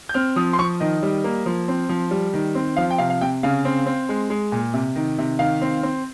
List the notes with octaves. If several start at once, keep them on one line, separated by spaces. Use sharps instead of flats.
G6
C4 F6
F3 D#6
C6
F3 C#6
D#3 D#5
G3
A#3
F3
C4
F3
G3
D#3
C4
F3 F5
G5
C3 F5
F5
C3 G5
C#3 F5
C4
C4
G#3
G#3
A#2
C3
D#3
C3
D#3 F5
C4
C4